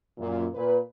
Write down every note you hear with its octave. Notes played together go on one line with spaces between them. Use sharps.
F#2 A#2
A#2 B4